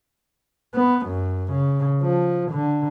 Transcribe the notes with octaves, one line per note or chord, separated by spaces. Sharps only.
B3
F#2
C#3
F3
D3